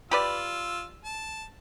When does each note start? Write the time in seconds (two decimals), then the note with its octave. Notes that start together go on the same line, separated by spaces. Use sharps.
0.11 F4 G4 B4 D5 E6
1.04 A5